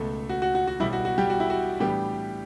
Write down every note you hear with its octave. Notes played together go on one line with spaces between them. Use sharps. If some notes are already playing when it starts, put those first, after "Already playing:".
Already playing: C#2 B2 A3 A4
F#4
F#4
F#4
F#4
B1 B2 G3 E4
F#4
F#4
G3 G4
F#4
E4
F#4
A2 E3 G3 B3 D4 G4